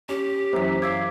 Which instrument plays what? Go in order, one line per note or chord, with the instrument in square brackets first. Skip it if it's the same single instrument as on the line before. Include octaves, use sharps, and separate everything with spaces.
[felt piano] C#4 [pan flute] G4
[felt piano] F#2 E3 F#3 [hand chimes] C5 B6
[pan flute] F5 [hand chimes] D6 E6 B6 [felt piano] G#6